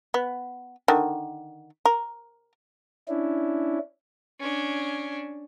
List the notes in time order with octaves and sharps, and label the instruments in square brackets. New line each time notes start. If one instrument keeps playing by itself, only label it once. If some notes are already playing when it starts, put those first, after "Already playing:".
[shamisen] B3
D3 D#3
A#4
[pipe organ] C#4 D4 E4
[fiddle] C#4 D4